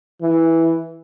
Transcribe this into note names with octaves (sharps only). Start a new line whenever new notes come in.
E3